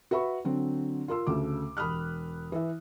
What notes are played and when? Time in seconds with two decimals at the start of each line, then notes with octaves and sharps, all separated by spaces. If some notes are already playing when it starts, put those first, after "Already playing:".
0.11 F#4 B4 E5 B5 C#6
0.45 D3 F#3 C4
1.08 F4 A#4 C6 E6
1.27 D2 C#3 A3 D6
1.77 E1 B5 D#6 F6 F#6
2.52 E3 E5